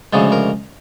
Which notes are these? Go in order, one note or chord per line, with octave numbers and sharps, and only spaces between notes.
D2 C#3 F3 G#3 A4
A#4